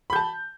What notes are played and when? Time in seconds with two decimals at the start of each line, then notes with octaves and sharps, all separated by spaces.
0.10 B5
0.13 G6
0.16 A5